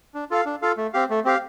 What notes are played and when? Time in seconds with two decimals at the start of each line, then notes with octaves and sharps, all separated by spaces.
0.14 D4
0.31 F4 A4 F5
0.46 D4
0.62 F4 A4 F5
0.77 A3
0.94 C4 G4 F5
1.10 A3
1.25 C4 G4 F5